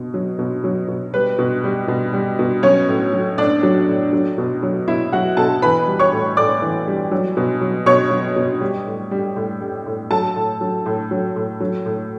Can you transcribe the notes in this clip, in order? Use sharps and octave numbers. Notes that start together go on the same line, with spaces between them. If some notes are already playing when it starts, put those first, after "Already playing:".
Already playing: B2
F#3
B2
F#3
B2
G3 B4
B2
G3
B2
G3
B2
F#3 C#4 C#5
A2
F#3
A2 D4 D5
F#3
A2
F#3
B2
F#3
B2 E4 E5
F#3 F#4 F#5
B2 A4 A5
E3 B4 B5
G3
C#5 C#6
A2
A2 D5 D6
E3
G3
F#3
B2
F#3
B2 C#5 C#6
F#3
B2
G3
A2
G3
A2
G3
A2
F#3 A4 A5
A2
F#3
A2
F#3
A2
F#3
A2